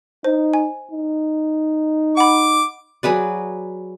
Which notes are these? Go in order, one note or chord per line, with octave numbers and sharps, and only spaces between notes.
D#4 C5
G#5
D#4
F#5 B5 D6
F#3 G#4 B4 D5